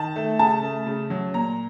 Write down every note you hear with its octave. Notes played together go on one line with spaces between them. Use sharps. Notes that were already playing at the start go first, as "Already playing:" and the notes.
Already playing: D#3 A5
A3
C#3 A5
A3
C#3
F#3
A#2 A#5